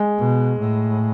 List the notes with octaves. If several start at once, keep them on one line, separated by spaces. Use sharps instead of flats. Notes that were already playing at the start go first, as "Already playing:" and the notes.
Already playing: G#3
B2
A2